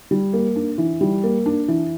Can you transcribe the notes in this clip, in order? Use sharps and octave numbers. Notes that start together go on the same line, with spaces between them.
G3
A#3
D4
E3
G3
A#3
D4
E3